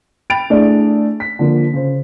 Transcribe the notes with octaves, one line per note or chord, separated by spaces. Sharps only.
G5 B5 A6 D7 F7
A3 D4 E4 G#4 D5
B6
D3 F3 A#3
C#3 C5